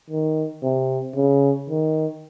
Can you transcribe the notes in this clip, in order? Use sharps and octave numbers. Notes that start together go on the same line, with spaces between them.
D#3
C3
C#3
D#3